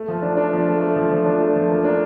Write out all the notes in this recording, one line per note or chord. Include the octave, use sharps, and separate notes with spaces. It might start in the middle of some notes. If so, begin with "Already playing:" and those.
Already playing: A3
F3
D4
D4
F3
A3
A3
F3
F3
D4
A3
F3
A#3
D4